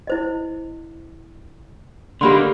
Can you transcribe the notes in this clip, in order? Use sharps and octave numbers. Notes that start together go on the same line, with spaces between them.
E4 C5 D#5
D3 A#3 D#4 G4 B5 C6